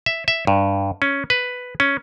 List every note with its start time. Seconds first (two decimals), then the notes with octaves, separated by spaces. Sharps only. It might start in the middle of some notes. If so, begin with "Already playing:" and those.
0.06 E5
0.28 E5
0.47 G2
1.02 C#4
1.30 B4
1.80 C#4